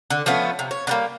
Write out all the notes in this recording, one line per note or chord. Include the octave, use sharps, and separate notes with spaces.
D3
F3 A3 B3 C#4
C3
C#5
D3 G3 A#3